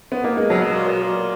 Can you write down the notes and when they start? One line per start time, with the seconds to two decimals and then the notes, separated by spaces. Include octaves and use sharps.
0.12 B3
0.24 A#3
0.37 G#3
0.50 C#3 F#3
0.63 B2
0.75 A#2
0.88 B2
1.02 A#2